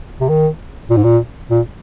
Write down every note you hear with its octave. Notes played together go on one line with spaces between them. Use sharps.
C3
D#3
A#2
G#2
A#2
A#2